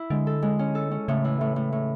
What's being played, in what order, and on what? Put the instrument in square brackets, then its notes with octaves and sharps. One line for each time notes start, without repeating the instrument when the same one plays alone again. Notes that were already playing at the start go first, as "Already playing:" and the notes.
Already playing: [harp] E4
[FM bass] D3 [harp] G#3
[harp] A4
G#3
C#4
A4
C#4
[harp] A2 [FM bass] C#3
[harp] E3
A2
A2
A2